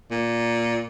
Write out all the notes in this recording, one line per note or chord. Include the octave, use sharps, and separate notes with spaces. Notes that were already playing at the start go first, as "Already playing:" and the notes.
A#2